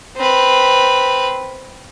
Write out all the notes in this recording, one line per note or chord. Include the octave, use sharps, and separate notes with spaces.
C4 B4